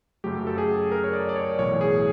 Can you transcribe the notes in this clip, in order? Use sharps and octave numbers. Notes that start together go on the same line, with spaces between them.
F#2 C#3 F#3 A3 G4
A4
G#4
A#4
C#5
D5
D5
C#5
B1 A2 E3 C#5
G#4